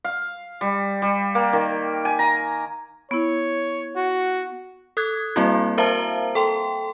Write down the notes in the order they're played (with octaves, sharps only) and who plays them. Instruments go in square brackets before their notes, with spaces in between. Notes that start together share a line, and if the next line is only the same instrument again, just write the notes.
[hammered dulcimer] F5
G3
G3
A#3
D#3
G#5
A#5
[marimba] B3 E4 [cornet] C#5
[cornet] F#4
[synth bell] A4 D#6 F#6 G#6
G3 A#3 C4 E4 F#4
A#4 C5 E5 F5 A5 A#5
A4 G5 C6